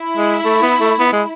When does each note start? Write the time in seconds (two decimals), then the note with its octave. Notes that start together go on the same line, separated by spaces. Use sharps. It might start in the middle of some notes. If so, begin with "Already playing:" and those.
Already playing: E4
0.18 G#3
0.45 A3
0.62 B3
0.81 A3
0.99 B3
1.13 G#3